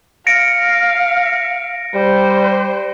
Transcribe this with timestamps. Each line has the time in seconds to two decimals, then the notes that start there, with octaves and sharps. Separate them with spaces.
0.27 F5 A#6 C#7 D7
1.95 G3 C5